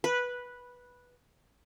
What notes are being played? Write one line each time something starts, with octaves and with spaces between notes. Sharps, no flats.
B4